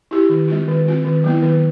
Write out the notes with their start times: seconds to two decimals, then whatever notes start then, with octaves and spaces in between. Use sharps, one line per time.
0.11 E4 G4
0.29 D#3
0.48 G#3 C4 F4
0.68 D#3
0.85 G#3 C4 F4
1.04 D#3
1.24 F#3 B3 E4
1.43 D#3